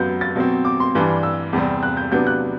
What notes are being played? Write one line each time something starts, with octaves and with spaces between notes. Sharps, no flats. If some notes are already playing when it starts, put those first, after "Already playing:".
Already playing: F#2 F#3 B3 G6
A6
B2 F#3 C4
D6
C6
G2 E3 G3 D4
E6
E2 C3 G3 C4
F#6
G6
C3 F#3 B3 D4 G6
F#6